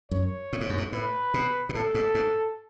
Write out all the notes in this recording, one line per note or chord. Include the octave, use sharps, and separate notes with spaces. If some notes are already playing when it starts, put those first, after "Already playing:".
F#2 C#5
A2
G#2
F#2
G#2
A2 B4
B2
B2
A2 A4
G#2
G#2